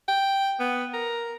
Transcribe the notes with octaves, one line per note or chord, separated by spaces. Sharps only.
G5
B3
A#4